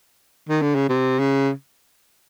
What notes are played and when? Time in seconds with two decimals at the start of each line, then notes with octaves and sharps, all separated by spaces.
0.49 D#3
0.62 D3
0.75 C#3
0.89 C3
1.19 C#3